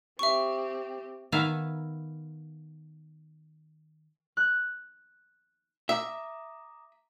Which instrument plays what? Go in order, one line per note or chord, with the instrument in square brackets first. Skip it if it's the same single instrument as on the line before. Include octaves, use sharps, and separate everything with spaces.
[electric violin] C4 G4 [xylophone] E5 C#6
[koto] D#3 B3 E5 F5 G#5 A#5
[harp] F#6
[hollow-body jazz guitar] E5 [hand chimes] A#5 D6 D#6